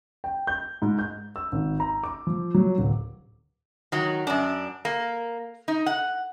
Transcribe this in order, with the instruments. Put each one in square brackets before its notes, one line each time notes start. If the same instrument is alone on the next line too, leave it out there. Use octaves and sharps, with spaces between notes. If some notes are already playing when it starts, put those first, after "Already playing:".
[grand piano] G5
G6
G#2
G6
E6
G#1
A#5
D6
F3
F#3
D1
[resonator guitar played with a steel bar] D#3 F#3
F#2 D4
A#3
D#4
F#5